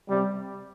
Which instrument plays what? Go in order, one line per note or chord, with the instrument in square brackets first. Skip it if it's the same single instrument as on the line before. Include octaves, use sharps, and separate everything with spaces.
[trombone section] C3 G3